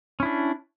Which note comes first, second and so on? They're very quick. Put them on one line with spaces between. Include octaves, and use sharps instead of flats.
C#4 E4 D4